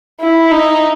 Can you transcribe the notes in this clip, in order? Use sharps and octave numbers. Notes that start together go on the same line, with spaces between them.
E4
D#4